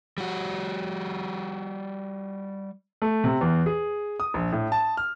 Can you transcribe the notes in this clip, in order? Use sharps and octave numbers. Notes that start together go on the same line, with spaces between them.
G3 F#4
A3
C3
E2
G#4
D#6
A#1
A2
A5
F6